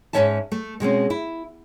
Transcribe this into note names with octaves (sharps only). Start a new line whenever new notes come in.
G#2 F3 C#4 C#5 E5 A5
A3
B2 G#3 C4 C#4
E4